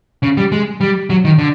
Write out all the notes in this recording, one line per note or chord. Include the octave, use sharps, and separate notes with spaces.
C#3
G3
G#3
G3
F#3
D#3
D3